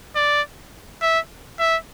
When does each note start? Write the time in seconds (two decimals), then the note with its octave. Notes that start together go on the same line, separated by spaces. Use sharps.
0.16 D5
1.02 E5
1.59 E5